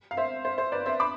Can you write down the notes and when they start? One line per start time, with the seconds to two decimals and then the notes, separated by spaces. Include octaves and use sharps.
0.11 F5
0.17 C5 E5
0.45 C5
0.58 C5
0.72 B4 D5
0.86 C5 E5
1.00 B5 D6